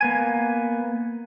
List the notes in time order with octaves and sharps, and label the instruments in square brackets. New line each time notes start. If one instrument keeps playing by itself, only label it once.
[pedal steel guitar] A#3 B3 G#5